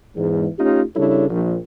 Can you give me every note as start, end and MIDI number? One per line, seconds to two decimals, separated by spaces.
0.16 0.46 40
0.16 0.46 44
0.59 0.83 57
0.59 0.83 61
0.59 0.83 63
0.59 0.83 65
0.59 0.83 67
0.96 1.26 49
0.96 1.26 55
0.96 1.26 62
0.96 1.26 64
0.96 1.26 69
0.96 1.26 73
1.30 1.57 34